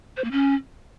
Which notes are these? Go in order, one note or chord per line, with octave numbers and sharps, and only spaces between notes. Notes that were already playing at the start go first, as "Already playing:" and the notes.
C5
A#3
C#4